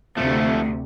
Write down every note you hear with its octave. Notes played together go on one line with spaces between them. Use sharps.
D2 C3 F3 A3